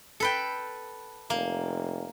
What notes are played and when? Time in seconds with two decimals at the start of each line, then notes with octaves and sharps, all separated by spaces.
0.20 A4 B4 G5
1.30 F1 A#3